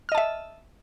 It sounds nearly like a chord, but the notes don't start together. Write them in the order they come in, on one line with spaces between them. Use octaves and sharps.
F6 D#5 A5 E5